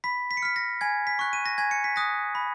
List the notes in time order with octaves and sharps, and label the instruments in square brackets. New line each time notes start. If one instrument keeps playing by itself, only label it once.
[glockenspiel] B5 B6
B6
C#7
F6 B6
A#6
G#5 G#6
B6
C#6 F#6
D#7
A#6
G#5 G#6
C#7
B6
D#6 F#6 A#6
B5